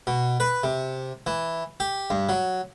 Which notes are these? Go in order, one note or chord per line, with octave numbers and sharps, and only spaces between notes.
B2
B4
C3
E3
G4
G2
F#3